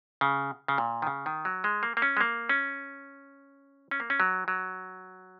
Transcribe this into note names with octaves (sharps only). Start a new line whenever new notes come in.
C#3
C#3
A#2
D#3
C#3
D#3
F#3
G#3
A#3
A#3
C#4
G#3
A#3
C#4
C#4
A#3
C#4
F#3
F#3